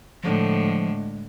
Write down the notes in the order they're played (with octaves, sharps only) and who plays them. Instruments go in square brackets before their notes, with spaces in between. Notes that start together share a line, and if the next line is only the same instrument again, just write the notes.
[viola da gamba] A2 D3 [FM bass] F3 [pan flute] G#3